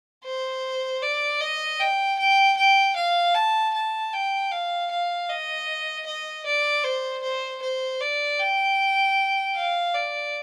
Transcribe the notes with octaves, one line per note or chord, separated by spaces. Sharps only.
C5
D5
D#5
G5
G5
G5
F5
A5
A5
G5
F5
F5
D#5
D#5
D5
C5
C5
C5
D5
G5
F5
D5